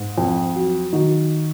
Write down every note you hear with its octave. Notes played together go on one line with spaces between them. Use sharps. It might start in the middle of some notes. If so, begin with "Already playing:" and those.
Already playing: G#2
F2
F#3
D#3 D#4 F#4